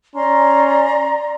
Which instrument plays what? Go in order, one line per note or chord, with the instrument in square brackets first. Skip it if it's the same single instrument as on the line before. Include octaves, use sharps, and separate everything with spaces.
[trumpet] C#4 [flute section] D5 A#5 C6